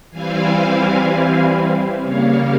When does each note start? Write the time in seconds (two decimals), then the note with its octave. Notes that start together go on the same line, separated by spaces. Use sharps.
0.11 E3 G3 C4 E4 F5 G#5
2.01 C#3 G3 A#3 C#5 F5